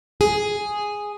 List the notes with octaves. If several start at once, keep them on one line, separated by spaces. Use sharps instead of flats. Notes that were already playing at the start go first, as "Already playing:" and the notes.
G#4